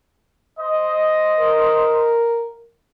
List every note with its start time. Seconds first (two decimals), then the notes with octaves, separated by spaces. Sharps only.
0.60 C5 D#5
1.39 A#4